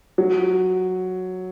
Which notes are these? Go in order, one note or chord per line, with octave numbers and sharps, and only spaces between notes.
F#3